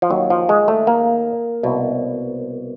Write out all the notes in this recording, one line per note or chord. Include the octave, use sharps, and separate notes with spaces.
F3
D#2 D#3 F#3
F3
G#3
A3
A#3
C2 B2